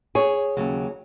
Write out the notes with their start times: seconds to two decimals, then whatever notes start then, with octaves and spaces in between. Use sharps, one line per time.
0.15 G#4 C#5
0.57 D#2 C#3 F#3